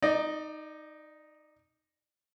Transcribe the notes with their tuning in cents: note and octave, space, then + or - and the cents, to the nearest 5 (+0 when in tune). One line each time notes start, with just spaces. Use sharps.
D#4 +0 D5 +30